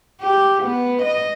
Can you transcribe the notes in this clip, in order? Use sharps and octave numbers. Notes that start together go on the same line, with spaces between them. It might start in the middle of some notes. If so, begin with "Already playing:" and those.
G4
B3
D#5